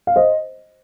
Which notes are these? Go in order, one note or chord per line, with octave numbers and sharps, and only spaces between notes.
F5
C5 D#5